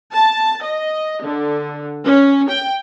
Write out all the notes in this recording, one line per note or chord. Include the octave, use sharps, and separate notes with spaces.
A5
D#5
D3
C#4
G5